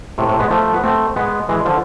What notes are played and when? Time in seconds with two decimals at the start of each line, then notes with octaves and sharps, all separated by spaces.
0.18 A2 C3
0.29 A2 C3
0.40 G#3 B3
0.50 F3 A3
0.73 B3
0.83 A3 C4
1.16 G#3 B3
1.49 E3 G#3
1.65 D3 F3